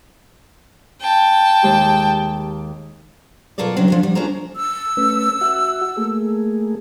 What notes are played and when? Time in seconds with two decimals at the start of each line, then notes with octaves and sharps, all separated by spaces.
1.00 G5 A5
1.62 D#2 G#3 G4
3.58 B2 F#3 F4 A4 A#4 D5
3.76 C#3 F#3 G3 C4 D4
3.88 F3 G#3 D4
4.03 G3
4.15 C#4 D4 F4 A#4 C5 A#5
4.56 E6
4.97 A3 C#4 B4
5.41 F#4 E5 F#5
5.97 A3 A#3 G#4